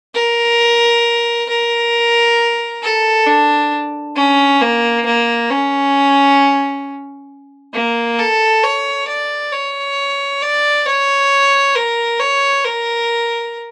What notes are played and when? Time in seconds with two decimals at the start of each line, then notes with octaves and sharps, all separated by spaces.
0.15 A#4
1.49 A#4
2.82 A4
3.27 D4
4.16 C#4
4.61 A#3
5.06 A#3
5.51 C#4
7.73 A#3
8.19 A4
8.63 C#5
9.08 D5
9.52 C#5
10.42 D5
10.86 C#5
11.75 A#4
12.20 C#5
12.65 A#4